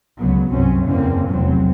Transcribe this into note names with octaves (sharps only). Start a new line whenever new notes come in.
C#2 D3 F#3 B3
G1 C2 F#2 F#3 C4 C#4
F#1 E2 D3 A#3 C4 C#4
F1 B1 E2 F#3 C4